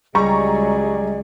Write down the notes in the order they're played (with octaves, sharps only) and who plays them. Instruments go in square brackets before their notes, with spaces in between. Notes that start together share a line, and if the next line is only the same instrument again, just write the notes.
[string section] C#2 F#3 [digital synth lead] G3 [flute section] G#4 D5 D#5 [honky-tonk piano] A#5 C#6